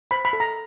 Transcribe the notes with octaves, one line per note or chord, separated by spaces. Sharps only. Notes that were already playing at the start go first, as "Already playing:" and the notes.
C5 B5
B5
A4
A#5